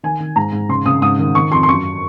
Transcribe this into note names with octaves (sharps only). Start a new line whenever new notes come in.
D#3 G#5
D#3
G#2 A#5
G#2
C#3 C6
C#3 D#6
G#2 D#6
D#3
D#3 C#6
F2 C6
C6
F#2 C#6